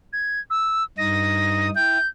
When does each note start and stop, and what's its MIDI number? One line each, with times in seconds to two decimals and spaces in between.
0.13 0.40 92
0.50 0.84 88
0.98 1.70 43
0.98 1.70 63
0.98 1.70 87
0.98 1.68 94
1.76 1.98 64
1.76 1.98 79
1.76 2.07 91